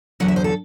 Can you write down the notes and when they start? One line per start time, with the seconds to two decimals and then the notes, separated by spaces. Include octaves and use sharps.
0.20 E2 D3 F#3 F#5
0.28 E5
0.36 C5
0.44 A4